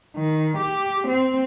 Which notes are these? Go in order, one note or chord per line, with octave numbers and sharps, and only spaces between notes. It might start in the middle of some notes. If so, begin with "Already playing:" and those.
D#3
G4
C4